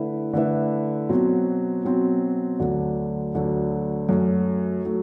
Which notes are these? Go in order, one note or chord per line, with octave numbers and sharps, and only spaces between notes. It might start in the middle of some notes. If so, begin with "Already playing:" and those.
Already playing: D3 A3 E4 B4 E5
D3 A3 E4 B4 E5
B2 F#3 C4
B2 F#3 C4
D2 D3 F#3
D2 D3 F#3
F#2 F#3 A3
F#3 A3